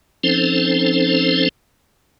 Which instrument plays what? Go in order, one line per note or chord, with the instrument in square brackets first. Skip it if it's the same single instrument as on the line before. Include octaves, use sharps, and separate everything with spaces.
[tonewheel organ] F3 C4 C#4 D#4 A4 C5